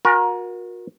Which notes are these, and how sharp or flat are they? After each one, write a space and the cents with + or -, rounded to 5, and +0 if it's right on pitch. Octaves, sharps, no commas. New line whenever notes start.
F#4 -35 A#4 +20 G#5 +0